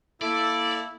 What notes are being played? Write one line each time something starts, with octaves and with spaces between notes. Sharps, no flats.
A#3 E4 A4 D5